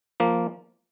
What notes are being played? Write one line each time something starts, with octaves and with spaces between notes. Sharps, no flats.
F3 A#3